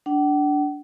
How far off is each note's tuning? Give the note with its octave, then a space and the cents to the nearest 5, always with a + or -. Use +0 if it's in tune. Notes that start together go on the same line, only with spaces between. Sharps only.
D4 -10 F#5 +45